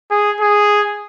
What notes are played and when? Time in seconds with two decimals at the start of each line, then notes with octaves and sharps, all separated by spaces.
0.11 G#4
0.41 G#4